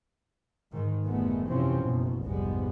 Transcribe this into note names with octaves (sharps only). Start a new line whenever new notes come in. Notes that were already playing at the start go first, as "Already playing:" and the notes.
G#2 D#3
F1 A#2 D3 G#3 A3 B3
F#1 C3 E3 F3 C4 C#4
F#1 B2
F1 A#1 G#2 G3 G#3 B3